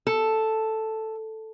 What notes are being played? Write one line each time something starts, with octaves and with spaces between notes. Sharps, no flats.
A4